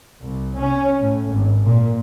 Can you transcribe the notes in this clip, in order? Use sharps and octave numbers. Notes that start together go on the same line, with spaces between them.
C2
C#4
A2
G#1
A#2